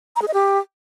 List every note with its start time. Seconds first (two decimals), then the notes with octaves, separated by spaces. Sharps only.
0.16 A#5
0.22 G#4
0.28 D#5
0.34 G4